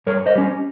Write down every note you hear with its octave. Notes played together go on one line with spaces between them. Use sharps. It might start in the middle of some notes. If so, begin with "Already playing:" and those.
G2 A#4 C#5
C5 D#5
G3 C#4